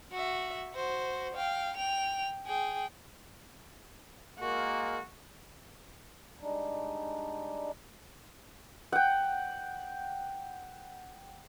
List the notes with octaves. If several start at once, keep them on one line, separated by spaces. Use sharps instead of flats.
F#4 E5
F#4 C5
F5 G5
G5 F7
G#4 G5
G#3 A#3 F#4
G3 G#3 D4 D#4
F#5 G5